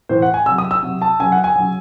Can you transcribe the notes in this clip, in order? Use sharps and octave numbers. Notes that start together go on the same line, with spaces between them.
A2 E3 C5
F#5
G#5
C3 F#3 E6
D#6
E6
C3 F#3
A5
C#3 F#3 G#5
F#5
G#5
F#3
C#3